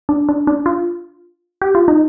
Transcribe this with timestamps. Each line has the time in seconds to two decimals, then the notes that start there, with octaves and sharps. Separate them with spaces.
0.09 D4
0.29 D4
0.47 D4
0.66 F4
1.62 G4
1.75 F4
1.88 D#4